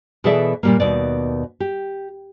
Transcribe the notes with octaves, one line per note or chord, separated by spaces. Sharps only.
B2 E3 G#4 A4 D5 E5
A#2 G3 A#3
D#2 B2 D5
G4